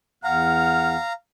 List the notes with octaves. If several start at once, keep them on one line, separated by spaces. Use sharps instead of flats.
E2 F5 F#5 A#5 F6